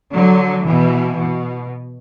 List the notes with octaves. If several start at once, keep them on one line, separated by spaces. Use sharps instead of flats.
D3 F#3
B2 E3
B2